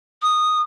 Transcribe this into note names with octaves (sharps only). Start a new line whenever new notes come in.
D#6